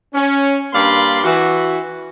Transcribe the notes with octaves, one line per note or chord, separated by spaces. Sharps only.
C#4
G2 A#3 D5 F5 B5 C6
E3 F#4